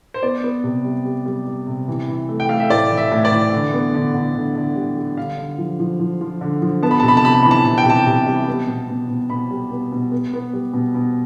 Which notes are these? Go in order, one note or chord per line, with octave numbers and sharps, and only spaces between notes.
C5
B3 D5
B3
C3
G3
G3
G3
G3
C3
E3
E3
A3
G5
A3 F5
E5
A2 D5
E3
E5
A2
D5
E3
D3
B3
D3
D3
D3
D3
G3
G3
D3 F5
D3
F3
F3
F3
F3
D3
F3
B3 A5
B5
C3 A5
B5
A5
C3 B5
A5
E3 B5
A5
C3 A5
G5
C3 A5
C3
G3
B3
B2
B2
B2
B2 B5
G3
B3
B2
B3
B3
G3
B2
B2